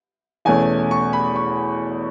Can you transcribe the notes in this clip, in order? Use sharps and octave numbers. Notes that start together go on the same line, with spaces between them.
E2 B2 A3 C#4 G#5
C#6
B5
C#6